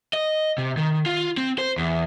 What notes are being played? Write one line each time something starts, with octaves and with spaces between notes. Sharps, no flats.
D#5
C3
D#3
F4
C4
C5
E2